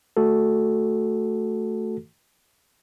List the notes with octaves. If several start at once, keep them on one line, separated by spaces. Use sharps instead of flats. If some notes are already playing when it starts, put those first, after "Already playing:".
A3 F#4 A4